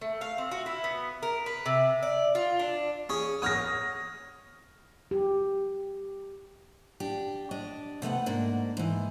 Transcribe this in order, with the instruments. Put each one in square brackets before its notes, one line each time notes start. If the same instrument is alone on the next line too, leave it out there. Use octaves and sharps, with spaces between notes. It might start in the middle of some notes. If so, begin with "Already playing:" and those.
[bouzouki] A3
F5
C4
F#4
E4
B3
A#4
B4
C3
D5
F4
D4
[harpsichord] C#4 G#4 C#5
[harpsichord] C#5 F#5 [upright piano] D#6 F6 A#6
[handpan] G4
[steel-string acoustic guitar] D4 G4
D4 D#5
C3 A3 B3 F#5
G#2 A#3 D4
G#2 E3